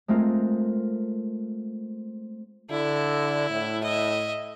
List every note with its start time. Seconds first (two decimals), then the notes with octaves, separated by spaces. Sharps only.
0.08 G#3 A3 C4 F4 A#4
2.71 D3 E4
3.50 A2
3.83 D#5 E5